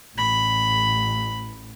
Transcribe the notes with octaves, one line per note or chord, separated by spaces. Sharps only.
A1 B5